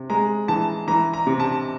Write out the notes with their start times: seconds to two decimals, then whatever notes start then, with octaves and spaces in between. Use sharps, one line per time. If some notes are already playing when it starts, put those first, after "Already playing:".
Already playing: C3
0.10 G#3 A#5
0.48 E3 A5
0.87 E3 A#5
1.14 A#5
1.27 C3
1.40 A5